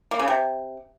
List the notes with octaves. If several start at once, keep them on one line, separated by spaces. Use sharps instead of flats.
A#3
C#3
C3